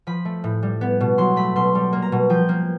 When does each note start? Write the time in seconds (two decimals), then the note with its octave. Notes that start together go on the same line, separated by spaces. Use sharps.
0.07 F3 B5
0.25 A3
0.44 A2
0.63 G3
0.81 B3
1.00 B2
1.18 F#3 C6
1.36 A3 B5
1.56 B2 C6
1.75 G3
1.93 A#3
2.02 A#5
2.12 B2
2.30 F3 G5
2.49 A#3